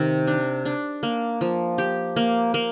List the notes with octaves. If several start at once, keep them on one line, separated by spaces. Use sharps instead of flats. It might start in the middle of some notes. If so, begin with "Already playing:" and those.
Already playing: C3 D#3
D4
D4
A#3
F3
G4
A#3
A#3